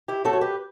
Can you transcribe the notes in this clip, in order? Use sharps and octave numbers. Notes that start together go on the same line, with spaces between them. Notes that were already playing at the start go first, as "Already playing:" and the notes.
E4 G4
F#3 A3 F#4 A4
C#5
G4 B4